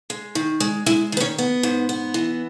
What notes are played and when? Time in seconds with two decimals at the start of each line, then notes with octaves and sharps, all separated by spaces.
0.10 G#3
0.35 D#3
0.60 G#3
0.86 G#3 E4 E5
1.12 D#3 B4
1.20 C#4 C#5
1.38 B3
1.63 G#2
1.89 B3
2.14 E3